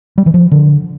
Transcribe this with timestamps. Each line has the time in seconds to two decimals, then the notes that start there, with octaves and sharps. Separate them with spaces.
0.18 G3
0.26 E3
0.34 F3
0.52 D3